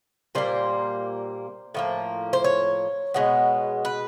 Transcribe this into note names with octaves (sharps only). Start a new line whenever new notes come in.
A#2 G3 A#3 C5
A2 F3 A#3
C5
C#5
B2 G#3 B3
B4